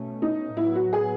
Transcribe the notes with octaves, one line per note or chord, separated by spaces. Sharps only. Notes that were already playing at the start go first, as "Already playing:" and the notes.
Already playing: B2 A3 C#4
D#4
A2 F#3 B3 E4
F#4
G#4